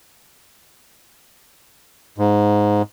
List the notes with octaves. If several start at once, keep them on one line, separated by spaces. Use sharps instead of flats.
G#2